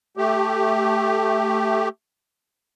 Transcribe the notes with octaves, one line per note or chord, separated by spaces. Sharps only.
A3 G4